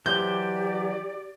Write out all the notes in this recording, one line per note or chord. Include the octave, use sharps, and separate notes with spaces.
E3 F#3 G4 C5 D5 G6